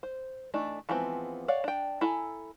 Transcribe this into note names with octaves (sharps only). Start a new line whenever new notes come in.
C5
E3 A3 D4 D#4
E3 F3 G#3 B3 C4
C#5 D5 F5 F#5
D4 G5
E4 A4 G#5 A#5